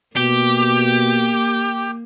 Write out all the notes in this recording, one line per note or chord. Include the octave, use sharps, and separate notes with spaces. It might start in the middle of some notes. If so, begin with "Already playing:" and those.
B2 A#3 G4